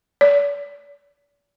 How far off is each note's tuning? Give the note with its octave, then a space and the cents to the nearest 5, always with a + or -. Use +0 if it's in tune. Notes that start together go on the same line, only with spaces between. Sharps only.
D5 -40